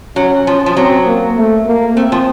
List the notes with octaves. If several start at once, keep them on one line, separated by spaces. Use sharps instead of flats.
F#3 C#4
F3
F3
F#3 C4
A#3
A3
A#3
A3 C4
F3